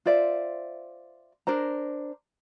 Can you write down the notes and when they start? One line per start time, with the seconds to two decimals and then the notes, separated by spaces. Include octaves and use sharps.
0.06 F4 C5 D5 E5
1.47 D4 A#4 C5 A#5